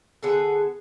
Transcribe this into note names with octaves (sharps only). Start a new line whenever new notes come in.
D3 B3 G#4 A4